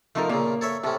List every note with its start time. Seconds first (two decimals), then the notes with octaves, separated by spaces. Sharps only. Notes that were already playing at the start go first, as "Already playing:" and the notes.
0.15 F3 A3 D#4 A#4
0.30 A#2 C#3 A#3
0.61 A4 C#5 E5
0.84 A2 C3 C#4 A4